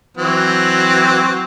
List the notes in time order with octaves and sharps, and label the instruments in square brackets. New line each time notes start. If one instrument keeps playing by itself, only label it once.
[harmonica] E3 F#3 C4